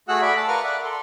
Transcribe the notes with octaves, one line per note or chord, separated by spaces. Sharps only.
A3 F#4 G#4 F#5 E6 F#6
D5 E5 B5
A5
A#4 B4 F5 C#6 F6
D5 E5 F#5
A4 C6